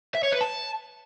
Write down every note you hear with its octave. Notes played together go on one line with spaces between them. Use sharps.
E5
C#5
B4
A5